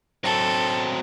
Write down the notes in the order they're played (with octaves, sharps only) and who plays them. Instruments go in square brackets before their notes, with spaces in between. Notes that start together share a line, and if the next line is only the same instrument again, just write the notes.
[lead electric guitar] F#3 C4 [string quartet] A4